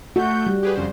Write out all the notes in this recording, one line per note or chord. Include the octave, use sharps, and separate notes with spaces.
A3 F#4 G6
G3
G4 G#4 B4
F2 C#3 C5